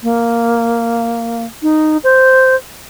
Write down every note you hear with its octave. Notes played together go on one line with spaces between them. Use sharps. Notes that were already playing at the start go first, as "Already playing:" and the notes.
A#3
D#4
C5